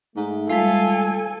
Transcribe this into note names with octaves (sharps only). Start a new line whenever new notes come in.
G#2 A3
G3 G#3 F4 A4 G#5